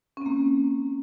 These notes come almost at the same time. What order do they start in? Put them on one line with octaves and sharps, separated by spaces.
C#4 C4 A#3